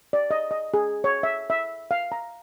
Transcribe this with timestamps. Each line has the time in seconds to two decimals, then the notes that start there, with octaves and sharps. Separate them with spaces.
0.13 D5
0.31 D#5
0.51 D#5
0.74 G#4
1.04 C#5
1.23 E5
1.50 E5
1.91 F5
2.12 A#5